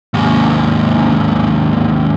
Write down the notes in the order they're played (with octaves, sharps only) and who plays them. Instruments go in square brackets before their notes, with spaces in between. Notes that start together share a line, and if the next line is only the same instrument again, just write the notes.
[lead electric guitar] D#2 G#2